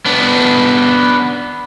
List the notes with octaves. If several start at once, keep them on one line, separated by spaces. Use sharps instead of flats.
B3 D4